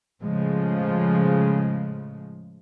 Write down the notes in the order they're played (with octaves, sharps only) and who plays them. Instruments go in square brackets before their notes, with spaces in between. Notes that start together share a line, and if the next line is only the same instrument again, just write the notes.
[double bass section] A2 C#3 F3 G#3